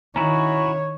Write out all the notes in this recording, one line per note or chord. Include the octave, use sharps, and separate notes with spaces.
D#3 C#4 E4 F#4 C#5 A#5